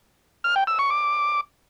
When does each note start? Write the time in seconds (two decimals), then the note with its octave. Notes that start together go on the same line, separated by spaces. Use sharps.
0.44 F6
0.56 G5
0.67 E6
0.79 C#6
0.90 D6